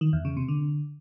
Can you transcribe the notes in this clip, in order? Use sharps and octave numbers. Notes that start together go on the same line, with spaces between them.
D#3
E2
C#3
C3
D3